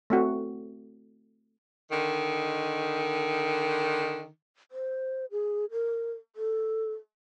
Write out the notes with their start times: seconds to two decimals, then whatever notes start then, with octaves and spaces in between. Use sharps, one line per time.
0.10 A3 C4 F#4
1.91 D3 D#3
4.71 C5
5.31 G#4
5.71 A#4
6.36 A4